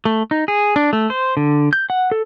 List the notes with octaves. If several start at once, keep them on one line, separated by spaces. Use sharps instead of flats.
A3
D#4
G#4
D4
A3
C5
D3
G6
F#5
A4